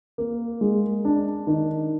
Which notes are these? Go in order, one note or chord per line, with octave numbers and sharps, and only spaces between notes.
A#3
G#3
D4
D#3